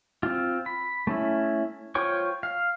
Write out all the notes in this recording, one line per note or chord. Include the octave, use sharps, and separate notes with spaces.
C4 F4
B5
A3 C#4 E4
F4 C5 C#5 G5 C#6
F5